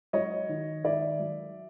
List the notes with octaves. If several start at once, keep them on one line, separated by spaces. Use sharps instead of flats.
F#3 C#5 D#5
D#3
D#3 D5 E5
F#3